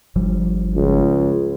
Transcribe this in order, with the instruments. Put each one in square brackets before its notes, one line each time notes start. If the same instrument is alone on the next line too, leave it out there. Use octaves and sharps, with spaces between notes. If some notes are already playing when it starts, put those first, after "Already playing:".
[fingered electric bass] G1 F3 G3
[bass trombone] C#2